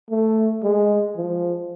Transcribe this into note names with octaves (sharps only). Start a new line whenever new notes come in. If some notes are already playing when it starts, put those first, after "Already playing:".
A3
G#3
F3